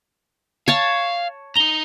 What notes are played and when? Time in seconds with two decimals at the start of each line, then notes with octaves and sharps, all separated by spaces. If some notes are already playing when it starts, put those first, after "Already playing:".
0.68 C#5 F5 A5
1.56 D#4 A#5 F7 G7